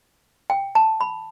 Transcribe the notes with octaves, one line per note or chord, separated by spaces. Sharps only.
G5
A5
B5